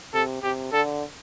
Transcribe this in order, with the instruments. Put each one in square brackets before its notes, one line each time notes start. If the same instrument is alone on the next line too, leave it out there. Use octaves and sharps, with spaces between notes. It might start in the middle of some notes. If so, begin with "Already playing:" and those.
[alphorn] C3 [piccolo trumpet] A4
[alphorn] C3 [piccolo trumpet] G4
[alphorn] D3 [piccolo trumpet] A4